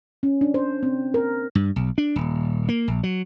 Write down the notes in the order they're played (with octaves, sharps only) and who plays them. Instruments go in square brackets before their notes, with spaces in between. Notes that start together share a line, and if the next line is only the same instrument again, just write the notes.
[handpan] C#4
D4
C5
C4
A#4
[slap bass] G2
B1
D4
D#1
A#3
A#1
F#3